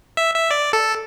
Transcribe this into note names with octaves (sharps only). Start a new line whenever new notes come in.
E5
E5
D5
A4